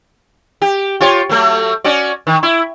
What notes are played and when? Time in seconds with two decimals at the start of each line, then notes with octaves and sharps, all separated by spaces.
0.62 G4
1.01 F4 G4 C#5
1.29 F#3 A3
1.84 C#4 F#4 D5
2.27 D#3
2.43 E4